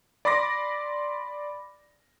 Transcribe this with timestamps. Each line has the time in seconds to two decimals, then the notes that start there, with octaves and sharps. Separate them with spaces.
0.25 D5 B5 C6 D6 A#6